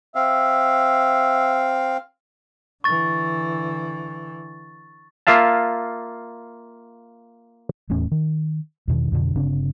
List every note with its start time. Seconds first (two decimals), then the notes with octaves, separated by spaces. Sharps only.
0.15 C4 E5 F5
2.84 D3 E3 C#6 A6
5.27 A#3 F4 E5 F5 A5
7.89 D#1 E2 A2 C#4
8.12 D#3
8.88 E2 B2 D#3
9.12 F2 B2 D3
9.35 G1 C#3 C4 D4